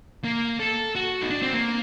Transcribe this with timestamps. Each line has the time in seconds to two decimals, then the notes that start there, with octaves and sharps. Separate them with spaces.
0.24 A#3
0.60 A4
0.96 F#4
1.23 D#4
1.30 D4
1.42 C4
1.53 A#3